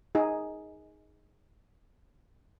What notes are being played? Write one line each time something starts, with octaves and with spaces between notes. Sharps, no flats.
D#4 G#4